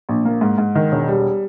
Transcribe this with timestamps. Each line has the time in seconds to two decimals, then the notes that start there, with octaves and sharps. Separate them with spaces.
0.09 A#1
0.25 A#3
0.41 G#2
0.58 G#2
0.75 D#3
0.92 E1
1.08 G3